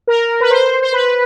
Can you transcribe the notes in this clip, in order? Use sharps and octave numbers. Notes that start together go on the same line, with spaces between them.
A#4
B4
C5
C5
B4